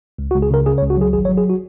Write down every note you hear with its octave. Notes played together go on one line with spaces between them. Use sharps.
C#2
F#4
C#2
G#4
C#3 A#4
C#3 G#4
C#5
C#2
F#4
F#3 G#4
G#1 G#4
C#5
F#3
G#4
F#4